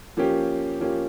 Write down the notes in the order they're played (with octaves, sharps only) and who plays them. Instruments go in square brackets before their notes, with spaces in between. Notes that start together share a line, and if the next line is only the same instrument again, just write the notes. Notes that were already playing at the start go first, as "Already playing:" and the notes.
[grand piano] F3 A#3 C#4 G4
F3 A#3 C#4 G4